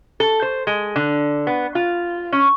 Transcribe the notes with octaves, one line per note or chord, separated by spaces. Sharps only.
A4
C5
G#3
D3
B3
F4
C#4